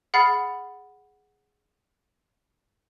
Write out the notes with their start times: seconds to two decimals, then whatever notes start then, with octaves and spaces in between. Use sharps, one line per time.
0.14 G#4 F#5 B5 F6 A6 C7